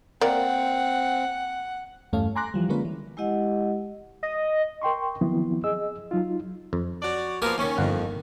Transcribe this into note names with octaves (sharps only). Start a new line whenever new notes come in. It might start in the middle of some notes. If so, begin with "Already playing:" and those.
A#3 C4 A#4 D5 F#5
E2 G2 A3 C#4 F5
G#5 A#5 C6 D6 F#6 A#6
E3 F3 G3
D3 G#3 A#3 C#4 F4 B4
E3
G#3 E4 G4 D#5 F#5
D#5
A#4 G5 C6 C#6
D#3 F3 F#3 B3 C4 E4
G#4 D#5 E6
F#3 D#4 F4
F2
F#4 C#5 D5
F3 A#3 B3 G4 G#4 A#4
D#2 D#3 C#4
G1 F2 F#5